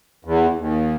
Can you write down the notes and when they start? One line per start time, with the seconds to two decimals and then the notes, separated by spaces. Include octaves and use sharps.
0.25 E2
0.59 D#2